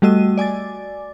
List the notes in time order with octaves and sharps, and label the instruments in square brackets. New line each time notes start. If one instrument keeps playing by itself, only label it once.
[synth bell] G3 A3 F#4 D#5 E6 D#7
D5 G#5 D6 A6